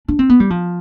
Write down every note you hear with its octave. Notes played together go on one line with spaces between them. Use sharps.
D4
C4
B3
G3
F3